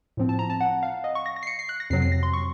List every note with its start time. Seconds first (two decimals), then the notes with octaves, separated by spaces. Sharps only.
0.17 A2 F3 C4
0.29 A5
0.39 A#5
0.50 A5
0.61 F#5
0.83 F5
1.04 D#5
1.15 C#6
1.26 A#6
1.36 A#6
1.43 C7
1.47 C#7
1.59 C7
1.69 F#6
1.80 A#6
1.90 F2 C3 F#3 C4 C7
2.02 C7
2.12 A#6
2.23 C6
2.33 C#6